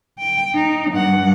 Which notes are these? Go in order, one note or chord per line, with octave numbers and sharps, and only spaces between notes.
G5
D#4
G2 F#5